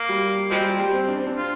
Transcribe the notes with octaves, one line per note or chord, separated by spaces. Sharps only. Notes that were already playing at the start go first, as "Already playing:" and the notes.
Already playing: A#3
G3
F3 G3 G#3 C4
G3
G3
C4
D4
C4
D4
F4